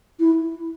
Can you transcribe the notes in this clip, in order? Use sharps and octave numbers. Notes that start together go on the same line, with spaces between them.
E4